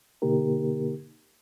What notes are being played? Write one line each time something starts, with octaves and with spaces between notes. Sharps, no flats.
B2 D3 A#3 D#4 G4 A#4